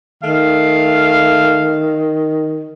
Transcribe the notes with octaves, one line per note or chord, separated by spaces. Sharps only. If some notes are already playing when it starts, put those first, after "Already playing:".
D#3 A3 F5